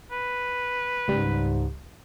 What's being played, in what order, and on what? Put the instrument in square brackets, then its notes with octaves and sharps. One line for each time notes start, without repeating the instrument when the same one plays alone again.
[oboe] B4
[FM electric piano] C#2 G3 [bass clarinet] G#2